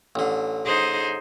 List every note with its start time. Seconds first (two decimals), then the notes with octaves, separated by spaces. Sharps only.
0.15 A1 D3
0.65 D#4 G#4 C5